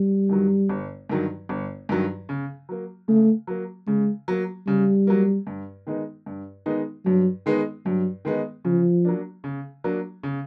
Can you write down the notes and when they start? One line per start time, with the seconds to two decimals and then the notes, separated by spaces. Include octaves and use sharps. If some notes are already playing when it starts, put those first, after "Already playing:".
Already playing: G3
0.29 G2 D#3 F#3
0.69 G1
1.10 G2 D#3 F#3
1.49 G1
1.89 G2 D#3 F#3
2.29 C#3
2.69 F#3 A#3
3.08 C#3 A3
3.47 F#3 A#3
3.87 C#3 G#3
4.28 F#3 A#3
4.67 C#3 G3
5.07 F#3 A#3
5.47 G2
5.87 D#3 G#3 B3 D#4
6.26 G2
6.66 D#3 G#3 B3 D#4
7.06 G2 F#3
7.46 D#3 G#3 B3 D#4
7.85 G2 F#3
8.25 D#3 G#3 B3 D#4
8.65 C#3 F3
9.05 F#3 A#3 D4
9.44 C#3
9.84 F#3 A#3 D4
10.23 C#3